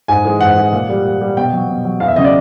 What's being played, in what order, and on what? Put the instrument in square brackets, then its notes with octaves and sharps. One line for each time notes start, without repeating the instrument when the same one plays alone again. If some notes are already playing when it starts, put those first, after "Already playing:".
[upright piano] G#2 G#5
E3 G#3
G#2 F#5
E3 G#3
A#2
G3
A#2
G3
B2 G5
F#3
B2
F#3
E2 F5
E5
C#3 F#3 D#5
D5